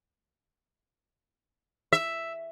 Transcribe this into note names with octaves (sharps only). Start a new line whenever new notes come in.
E5